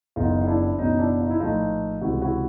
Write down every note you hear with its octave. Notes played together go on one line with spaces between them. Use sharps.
F#1 E2 C#3 E3 D#4 F4
F4
D4 E4
F#1 E2 B2 F#3 C#4 D#4
D4 E4
D#4 F4
E4
A#1 A2 F3 A3 D#4 F4
C#2 C3 E3 G#3 E4 F#4
E4 F#4